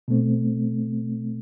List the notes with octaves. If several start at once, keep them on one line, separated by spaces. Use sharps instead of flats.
B2 A3 C4